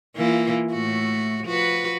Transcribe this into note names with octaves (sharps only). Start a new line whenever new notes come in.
E3 A#3 F4
A2 A3 F#4
F3 F#4 B4